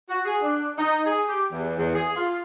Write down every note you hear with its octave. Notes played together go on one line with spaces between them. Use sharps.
F#4
G#4
D4
D#4
G#4
G4
E2
E2
G#4
F4